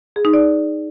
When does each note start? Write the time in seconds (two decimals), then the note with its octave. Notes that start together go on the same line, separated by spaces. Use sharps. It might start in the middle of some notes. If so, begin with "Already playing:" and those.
0.16 G#4
0.25 D#4
0.33 D5